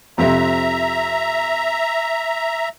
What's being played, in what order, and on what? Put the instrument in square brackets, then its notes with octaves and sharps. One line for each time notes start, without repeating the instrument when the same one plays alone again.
[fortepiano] F2 C3 [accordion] E5 A#5